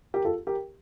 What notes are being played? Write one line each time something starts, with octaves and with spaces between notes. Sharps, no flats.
G4 A#4
F4 A4
G4 A#4